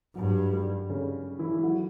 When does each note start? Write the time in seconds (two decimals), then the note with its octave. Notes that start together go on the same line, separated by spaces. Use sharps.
0.15 G2 F#3
0.53 G3
0.90 C#3 C#4
1.39 E3 E4
1.57 E4
1.63 F#3 F#4